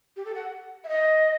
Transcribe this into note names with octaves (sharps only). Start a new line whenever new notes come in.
G4
A4
F#5
E5
D#5